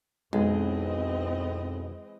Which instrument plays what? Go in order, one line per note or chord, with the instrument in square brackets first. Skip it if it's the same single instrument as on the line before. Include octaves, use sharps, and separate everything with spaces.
[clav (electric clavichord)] B1 [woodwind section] F2 [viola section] E3 C4 D#5 [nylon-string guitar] G#3